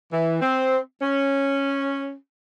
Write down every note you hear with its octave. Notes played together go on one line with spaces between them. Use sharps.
E3
C4
C#4